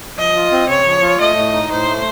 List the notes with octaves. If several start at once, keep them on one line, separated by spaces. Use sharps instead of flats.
F3 D#5
F4
C4
C#3 C#5
F3
F4
A3 D#5
A2
D#4
A2 C5
A3